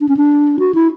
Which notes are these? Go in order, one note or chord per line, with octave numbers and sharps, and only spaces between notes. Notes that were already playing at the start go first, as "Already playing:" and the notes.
D4
C#4
D4
F#4
E4